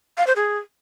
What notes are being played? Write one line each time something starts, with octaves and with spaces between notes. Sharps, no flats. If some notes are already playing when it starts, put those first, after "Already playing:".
F5
C5
G#4